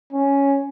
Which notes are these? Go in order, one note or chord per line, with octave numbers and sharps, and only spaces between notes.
C#4